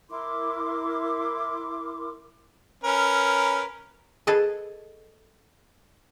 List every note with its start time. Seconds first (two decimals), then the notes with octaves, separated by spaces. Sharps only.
0.09 E4 A#4 C6 D6
2.84 C#4 A#4 B4
4.27 G#4 A4 B4 D#5